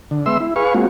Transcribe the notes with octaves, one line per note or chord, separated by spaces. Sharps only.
D3
G#3 B3 E5 C6 E6
E4
G#4 B4 F5 C#6
G#3 A#3 C4 F4 F#4